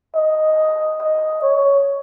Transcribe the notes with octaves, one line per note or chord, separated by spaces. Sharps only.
D#5
D#5
C#5